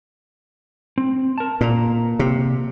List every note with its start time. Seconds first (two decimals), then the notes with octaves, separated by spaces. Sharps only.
0.98 C4
1.38 A#4 A5
1.61 A#2 A#3 A#5
2.19 C3